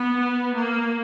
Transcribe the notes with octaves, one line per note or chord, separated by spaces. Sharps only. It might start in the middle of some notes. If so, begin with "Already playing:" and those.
Already playing: B3
A#3